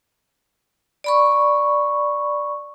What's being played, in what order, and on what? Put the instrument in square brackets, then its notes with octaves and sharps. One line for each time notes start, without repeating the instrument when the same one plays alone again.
[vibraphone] D5 B5 C#6